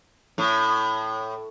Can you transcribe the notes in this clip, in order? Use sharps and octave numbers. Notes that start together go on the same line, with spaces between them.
A2